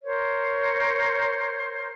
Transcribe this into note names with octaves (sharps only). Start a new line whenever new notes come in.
A#4 C5 C#5